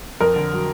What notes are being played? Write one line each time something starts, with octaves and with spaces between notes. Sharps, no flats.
F2 A#4
D3
F#3